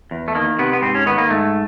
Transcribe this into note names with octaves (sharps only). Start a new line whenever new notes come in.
E2
A3
D#3 A#3
C3 B3
B3
G#2 C4
C#4
D#3 B3
A#3
G#2 A3